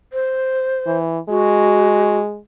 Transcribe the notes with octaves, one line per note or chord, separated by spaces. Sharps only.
C5
E3
G#3 F#4